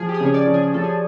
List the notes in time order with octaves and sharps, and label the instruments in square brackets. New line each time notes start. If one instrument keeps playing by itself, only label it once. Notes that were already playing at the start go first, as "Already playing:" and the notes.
Already playing: [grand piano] F3 [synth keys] G#4
[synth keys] G4
G#4
[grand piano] C#3
[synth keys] C#5
D5
[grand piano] F3
[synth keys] G#4
[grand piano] F3 [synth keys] A4
[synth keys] G#4